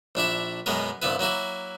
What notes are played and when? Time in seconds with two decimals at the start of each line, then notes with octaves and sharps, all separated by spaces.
0.15 A#1 D4 E4 E5
0.66 F#2 B2 G#3 B3 A#4
1.02 C2 G2 B3 E4 B4
1.19 F#3 A#3 E4 F#4